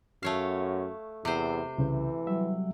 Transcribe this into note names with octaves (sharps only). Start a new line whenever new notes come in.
F#2 A3 C#5 F5
E2 C3 C5
C2 C#3 E3
F#3 G3 E5